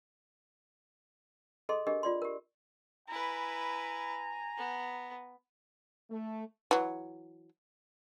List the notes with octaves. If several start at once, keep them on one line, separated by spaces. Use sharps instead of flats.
G#4 A4 D#5 C6
D4 G4 G#4 A#4 D#5
F4 D5 C6
G4 A#4
E4 B4 G#5 A#5
B3
A3
E3 F#3